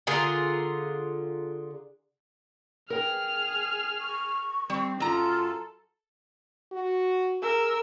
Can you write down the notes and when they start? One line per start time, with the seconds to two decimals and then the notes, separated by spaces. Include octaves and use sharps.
0.07 D3 F4 G#4 A#4
2.90 G#4 A#4 G5 F6
4.01 C#6
4.70 G3 C4
5.00 F#2 F4 A4 A#5
6.72 F#4
7.42 G#4 A#4 E6